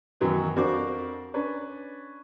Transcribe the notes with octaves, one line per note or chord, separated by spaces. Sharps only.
F#2 D#3 E3 F#3 B3
F2 D4 F#4 A#4 C5 D6
C#4 D4 B4